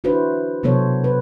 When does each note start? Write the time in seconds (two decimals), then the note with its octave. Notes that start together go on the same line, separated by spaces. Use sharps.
0.04 D4 E4 F#4 B4 C5
0.63 C3 F#3 B3 A4 C5 C#5
1.04 B4